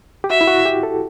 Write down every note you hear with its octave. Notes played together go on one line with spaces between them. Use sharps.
G4
F#4 E5
E4
F#4
G4
A4